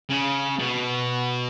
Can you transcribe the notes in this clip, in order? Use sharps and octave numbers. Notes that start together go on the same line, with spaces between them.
C#3
B2